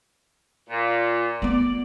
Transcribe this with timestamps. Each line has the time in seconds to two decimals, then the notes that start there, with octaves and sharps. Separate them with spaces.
0.70 A#2
1.42 A3 B3 D5